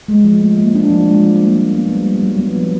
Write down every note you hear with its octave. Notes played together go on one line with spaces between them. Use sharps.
G#3
F3
A3
A#3
D4
F3
G#3
G3
A#3
G#3
B3
G3
A#3
F#3
B3
F3